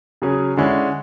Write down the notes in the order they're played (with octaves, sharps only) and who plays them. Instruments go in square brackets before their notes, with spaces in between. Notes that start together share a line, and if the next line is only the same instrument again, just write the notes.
[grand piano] C#3 F#3 C#4 G#4
D3 G#3 C#4 E4